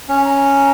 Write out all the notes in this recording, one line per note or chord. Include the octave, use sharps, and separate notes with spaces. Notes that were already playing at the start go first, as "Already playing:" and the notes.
C#4
G#5
A#5